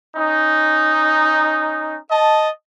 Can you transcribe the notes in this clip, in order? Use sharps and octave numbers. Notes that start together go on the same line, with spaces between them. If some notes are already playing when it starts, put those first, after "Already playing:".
C#4 D#4
D#5 A5